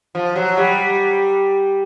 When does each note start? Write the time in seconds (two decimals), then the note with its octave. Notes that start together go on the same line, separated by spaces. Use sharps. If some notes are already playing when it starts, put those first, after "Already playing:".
0.15 F3
0.36 F#3
0.57 G3